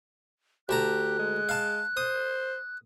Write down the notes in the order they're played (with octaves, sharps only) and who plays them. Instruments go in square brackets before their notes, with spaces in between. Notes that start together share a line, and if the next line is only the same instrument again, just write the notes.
[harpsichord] D2 A5 A#5 [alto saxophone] G4 [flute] F#6
[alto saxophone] G#3
[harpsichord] F5 A5
[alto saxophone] C5 [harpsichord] D#6